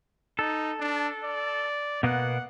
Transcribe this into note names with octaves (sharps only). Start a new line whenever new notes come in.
D#4 A4
D4
D5
B2 A#3 B3 F#5